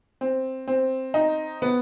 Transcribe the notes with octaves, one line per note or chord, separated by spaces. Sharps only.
C4
C4
D#4
B3